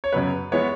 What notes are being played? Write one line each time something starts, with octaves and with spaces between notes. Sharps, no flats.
C#5
F#2 C#3 F#3 B3 B4
E3 G#3 B3 C#5